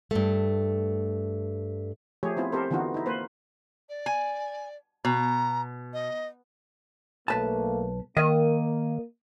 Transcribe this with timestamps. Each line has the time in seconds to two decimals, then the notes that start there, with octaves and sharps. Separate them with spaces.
0.11 G2 A3
2.23 F3 A3 G4 G#4 C#5
2.37 B3 C4 E4 F4
2.52 C4 G4 A4 A#4 C5
2.71 D3 E3 B3 D#4 F4 F#4
2.94 D#4 E4
3.06 A#3 B4 C5
3.89 D5
4.06 G#5
5.05 B2 A#5
5.93 D#5
7.28 B1 A3 A#3 B4 A5
8.17 D#3 A#3 D#5